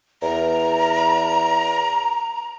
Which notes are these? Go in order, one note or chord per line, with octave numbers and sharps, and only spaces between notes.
E2 A#5